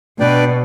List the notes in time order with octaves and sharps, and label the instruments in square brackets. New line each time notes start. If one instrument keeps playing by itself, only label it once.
[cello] B2 [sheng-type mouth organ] D4 B4 D5 G5